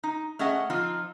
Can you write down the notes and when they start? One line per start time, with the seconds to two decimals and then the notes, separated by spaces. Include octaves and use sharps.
0.04 D#4
0.39 A3 C#4 G#4 D#5 F#5
0.70 F3 C4 D#4 F4